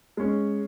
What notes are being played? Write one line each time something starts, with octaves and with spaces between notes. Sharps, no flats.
G#3 C#4